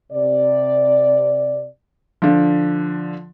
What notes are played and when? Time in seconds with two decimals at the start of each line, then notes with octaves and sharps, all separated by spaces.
0.11 C3 D5
2.22 D3 F3